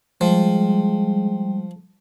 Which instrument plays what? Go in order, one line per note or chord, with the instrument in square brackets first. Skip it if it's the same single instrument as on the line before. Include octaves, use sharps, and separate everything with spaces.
[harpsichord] F3 [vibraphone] G3 [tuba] G#3